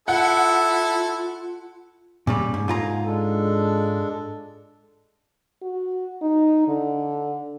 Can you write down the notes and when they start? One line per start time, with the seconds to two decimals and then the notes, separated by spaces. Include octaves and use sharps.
0.08 E4 F4 A4 F#5
2.27 A#2 C#3 G3
2.54 G#2
2.68 G#2 D3 F4 G#5 A#5
3.05 G#3 D4 A4
5.62 F#4
6.22 D#4
6.68 D3